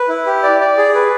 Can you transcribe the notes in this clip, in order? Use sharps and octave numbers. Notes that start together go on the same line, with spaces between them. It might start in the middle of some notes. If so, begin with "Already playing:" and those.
Already playing: B4
E4
G4
D5
D5
G#4
B4